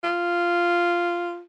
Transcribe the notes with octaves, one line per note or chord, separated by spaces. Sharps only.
F4